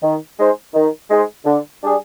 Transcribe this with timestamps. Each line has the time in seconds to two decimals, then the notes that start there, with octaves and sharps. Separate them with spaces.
0.02 D#3
0.38 G#3 D#4 G#4 C5
0.74 D#3
1.09 G#3 D#4 G#4 C5
1.45 D3
1.82 G3 D4 G#4